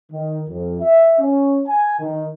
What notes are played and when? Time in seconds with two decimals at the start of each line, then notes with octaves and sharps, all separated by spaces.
0.12 D#3
0.49 F2
0.81 E5
1.19 C#4
1.67 G#5
2.00 D#3